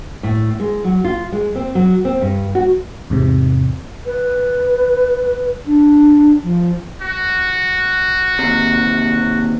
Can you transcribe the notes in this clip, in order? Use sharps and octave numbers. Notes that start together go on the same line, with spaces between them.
A2
G#3
F#3
F4
G#3
C4
F#3
C4
G2
F#4
E2 G#2 C3
B4
D4
F3
F#4
D#2 C3